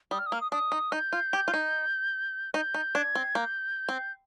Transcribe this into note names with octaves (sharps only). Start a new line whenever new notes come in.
G3 D#6
F6
D#6
A#3 F6
D#6
D4 D#6
D#4
D#4 G6
F4
G4
F4
D#4
D#4 G6
D#4
D4 G#6
C4
A#3 G6
C4